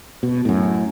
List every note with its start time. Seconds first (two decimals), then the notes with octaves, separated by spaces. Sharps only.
0.23 B2
0.45 F#2 A2